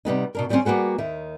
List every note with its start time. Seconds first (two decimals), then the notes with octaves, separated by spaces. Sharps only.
0.05 C3 G3 B3 D#4
0.35 B2 D4 A#4
0.49 D#3 G3 G#3 A#3 C4 C#4
0.65 G3 A#3 B3 F#4 G#4
0.98 D#2 D#3 E5